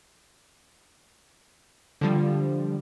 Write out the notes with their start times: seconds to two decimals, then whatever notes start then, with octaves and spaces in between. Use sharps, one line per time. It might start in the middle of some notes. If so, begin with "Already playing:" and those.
2.01 D3 F3 G3